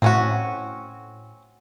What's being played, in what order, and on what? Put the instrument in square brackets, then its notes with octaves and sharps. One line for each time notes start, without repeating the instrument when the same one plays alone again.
[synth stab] A2 [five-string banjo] C4 C#4 F#4